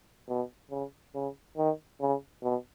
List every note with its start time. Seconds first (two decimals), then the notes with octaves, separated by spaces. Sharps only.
0.28 B2
0.71 C#3
1.15 C#3
1.57 D#3
2.01 C#3
2.43 B2